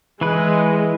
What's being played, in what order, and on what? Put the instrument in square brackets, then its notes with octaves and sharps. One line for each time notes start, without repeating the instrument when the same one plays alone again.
[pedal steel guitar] E3 B4 [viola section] G#3